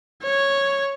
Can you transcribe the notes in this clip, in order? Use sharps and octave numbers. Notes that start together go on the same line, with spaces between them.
C#5